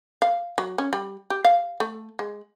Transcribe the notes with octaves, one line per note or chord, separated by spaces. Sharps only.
F5
F#3
C#4
G3
G4
F5
A3
G#3